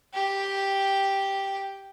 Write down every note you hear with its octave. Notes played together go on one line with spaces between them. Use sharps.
G4 G5